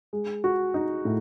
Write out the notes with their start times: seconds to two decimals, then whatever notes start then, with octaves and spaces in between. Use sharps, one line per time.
0.13 G#3
0.44 F#4
0.74 D#4
1.05 A2